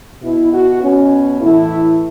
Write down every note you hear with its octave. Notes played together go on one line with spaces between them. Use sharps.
B2 E4
F#4
B2 C#4
A2 E3 E4